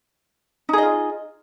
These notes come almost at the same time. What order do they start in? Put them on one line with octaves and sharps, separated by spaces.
D#4 G#4 D#5 F4